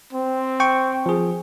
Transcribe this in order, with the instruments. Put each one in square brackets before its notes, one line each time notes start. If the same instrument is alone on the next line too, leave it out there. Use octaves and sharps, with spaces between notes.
[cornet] C4
[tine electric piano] G5 C#6
F3 G#4